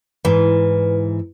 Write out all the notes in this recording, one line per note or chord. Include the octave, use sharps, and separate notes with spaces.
G#2 E3 B4